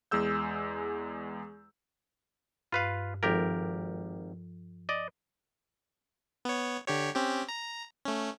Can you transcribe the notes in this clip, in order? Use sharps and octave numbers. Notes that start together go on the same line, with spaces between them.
E2 G#3 G#4 E6 G6
G2 F4 B4 F5
G#1 F3 F4 G4 A4 A#4
D5 D#5
B3 C#5
D3 G4 C#5
C4 C#4 G4
A#5
A3 C#4